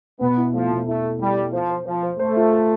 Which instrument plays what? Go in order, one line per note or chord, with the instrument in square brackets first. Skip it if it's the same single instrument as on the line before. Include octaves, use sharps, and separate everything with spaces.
[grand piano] B2 [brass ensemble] B3
[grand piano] E4
[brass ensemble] F3 [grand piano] A3
[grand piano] B2
[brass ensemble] A3 [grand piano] E4
[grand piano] A4
[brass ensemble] G3 [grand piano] E4
[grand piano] A4
[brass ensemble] F3 [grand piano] C5
[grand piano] C5
[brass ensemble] F3 [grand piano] C5
[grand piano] C5
[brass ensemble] A3 [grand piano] C5
[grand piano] F4
A4